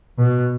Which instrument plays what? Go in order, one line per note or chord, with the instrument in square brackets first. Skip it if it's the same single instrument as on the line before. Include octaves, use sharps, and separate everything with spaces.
[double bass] B2